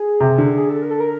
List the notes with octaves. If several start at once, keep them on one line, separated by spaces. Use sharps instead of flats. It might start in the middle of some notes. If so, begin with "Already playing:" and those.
Already playing: G#4
C3
D3
G#4
A4
A#4
A4
A#4